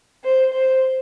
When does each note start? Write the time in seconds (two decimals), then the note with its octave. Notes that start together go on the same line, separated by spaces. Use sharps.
0.24 C5
0.53 C5